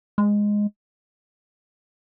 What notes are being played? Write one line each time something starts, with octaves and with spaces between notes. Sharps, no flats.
G#3